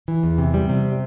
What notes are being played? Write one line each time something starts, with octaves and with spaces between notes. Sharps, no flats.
E3
E2
C3
G3
C3